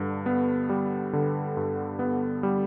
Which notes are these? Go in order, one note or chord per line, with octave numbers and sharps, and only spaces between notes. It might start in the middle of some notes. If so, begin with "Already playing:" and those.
Already playing: G2 D3
B3
G3
D3
G2
B3
G3